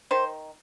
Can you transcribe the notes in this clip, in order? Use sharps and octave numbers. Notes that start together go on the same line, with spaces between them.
D#3 C5